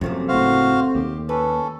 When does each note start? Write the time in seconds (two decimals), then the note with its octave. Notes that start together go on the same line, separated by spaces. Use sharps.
0.01 F#2 C3 F3 A3 A#3
0.28 F#1 A2 F#4 C5 F5
0.95 D#2 G4
1.29 C#4 A4 B4